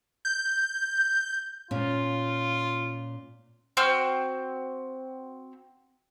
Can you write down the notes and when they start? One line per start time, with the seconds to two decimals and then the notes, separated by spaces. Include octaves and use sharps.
0.25 G6
1.71 A#2 C#4 F4
3.77 C4 F#4 C6 F6